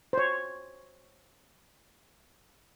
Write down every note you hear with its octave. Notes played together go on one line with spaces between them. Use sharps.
C5 C#5